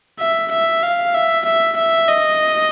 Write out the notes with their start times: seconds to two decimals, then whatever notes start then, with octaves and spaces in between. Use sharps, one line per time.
0.20 E5
0.51 E5
0.83 F5
1.14 E5
1.45 E5
1.77 E5
2.08 D#5